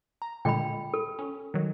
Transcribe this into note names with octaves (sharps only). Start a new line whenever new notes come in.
A#5
A#2 D3 G#3 G5 B5
A4
C#4
D#3 F#3